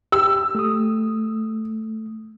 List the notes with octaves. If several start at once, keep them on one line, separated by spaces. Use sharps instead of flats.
G4 E6
A3 D#6